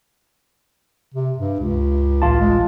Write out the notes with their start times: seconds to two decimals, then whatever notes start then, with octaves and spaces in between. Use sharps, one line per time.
1.14 C3
1.38 G2
1.60 C#2
2.22 A1 F4 A5
2.40 G#3